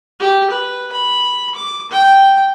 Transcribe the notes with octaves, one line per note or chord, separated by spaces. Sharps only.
G4
B4
B5
D6
G5